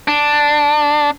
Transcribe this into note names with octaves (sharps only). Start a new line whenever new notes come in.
D4